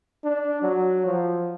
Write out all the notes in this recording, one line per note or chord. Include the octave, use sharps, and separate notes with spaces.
D4
F#3
F3